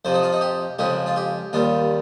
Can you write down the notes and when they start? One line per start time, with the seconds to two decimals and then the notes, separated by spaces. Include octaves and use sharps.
0.05 F2 C3 F3 C5
0.14 D#4
0.23 F4
0.33 D#4
0.41 G4
0.79 F2 C#3 F3 G#3 G4
1.06 F4
1.16 G4
1.53 D#2 D#3 G3 F4